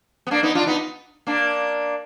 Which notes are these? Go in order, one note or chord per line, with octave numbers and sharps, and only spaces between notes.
B3
A#3 D4
B3 D#4
D4 F4
B3 D#4
A#3 D4